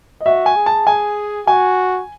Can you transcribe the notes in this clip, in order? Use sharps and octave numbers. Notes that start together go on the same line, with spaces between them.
D#5
F#4 E5
G#5
G#4
A5
G#4 G#5
F#4 G#5